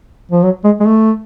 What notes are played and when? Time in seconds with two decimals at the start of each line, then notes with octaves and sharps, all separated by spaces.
0.31 F3
0.43 F#3
0.64 G#3
0.80 G#3
0.86 A3